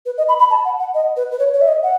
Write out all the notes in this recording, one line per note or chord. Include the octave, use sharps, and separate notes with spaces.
B4
D#5
B5
B5
A5
F#5
F#5
D#5
B4
B4
C#5
C#5
E5
D#5
F#5